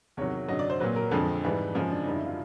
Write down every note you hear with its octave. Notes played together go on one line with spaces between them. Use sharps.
E2 C3 D#3 F#3 C#5
F#2 D3 F#3 D#5
D5
C5
A#2 F#3 B4
A#4
F2 D3 F3 G#3 A4
G#2 E3 G3
F#2 C#3 F3 G#3
D4
F#2 D3 G3 D#4
E4
F4